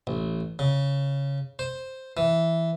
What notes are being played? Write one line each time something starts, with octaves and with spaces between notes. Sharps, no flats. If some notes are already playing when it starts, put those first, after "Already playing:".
A1
C#3
C5
E3